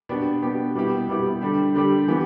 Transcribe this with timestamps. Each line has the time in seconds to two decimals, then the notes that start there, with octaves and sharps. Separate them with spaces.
0.09 B2 B3 D4 G4
0.42 B2 B3 D4 G4
0.75 B2 G3 B3 E4 G4
1.08 B2 G3 B3 E4 G4
1.41 D3 G3 D4 G4
1.74 D3 G3 D4 G4
2.08 E3 B3 G4